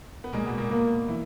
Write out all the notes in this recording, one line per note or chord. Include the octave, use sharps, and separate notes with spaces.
B3
A#2 G#3 A#3
B2 B3
A#2 A#3
B2 A#3 B3
E3 E4